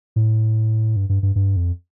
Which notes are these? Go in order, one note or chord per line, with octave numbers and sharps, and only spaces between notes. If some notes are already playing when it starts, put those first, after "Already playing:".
A2
G2
G2
G2
G2
F2